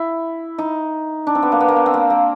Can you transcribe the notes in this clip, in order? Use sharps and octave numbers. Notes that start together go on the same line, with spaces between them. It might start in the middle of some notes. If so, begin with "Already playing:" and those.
Already playing: E4
D#4
D4
C4
B3
A#3
B3
A#3
B3
C4
A#3
A#3